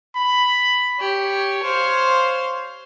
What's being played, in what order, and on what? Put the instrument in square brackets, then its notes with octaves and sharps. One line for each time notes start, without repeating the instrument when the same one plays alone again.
[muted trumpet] B5
[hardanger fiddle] G4 [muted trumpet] C#5
[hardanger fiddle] C5 F5